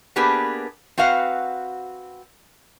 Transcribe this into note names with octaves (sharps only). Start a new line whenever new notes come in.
A#3 B3 D4 G4 G#4 B4
C4 F#4 B4 F5 F#5